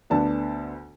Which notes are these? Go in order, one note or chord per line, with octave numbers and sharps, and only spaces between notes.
D2 D3 B3 D4 A5